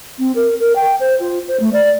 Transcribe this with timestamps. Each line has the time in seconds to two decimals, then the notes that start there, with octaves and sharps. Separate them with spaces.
0.19 C4
0.35 A#4
0.60 A#4
0.76 G5
1.00 C5
1.20 F4
1.48 C5
1.60 A3
1.73 D5